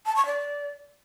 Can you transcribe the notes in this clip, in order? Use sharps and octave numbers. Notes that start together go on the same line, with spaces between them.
A5
C#6
D5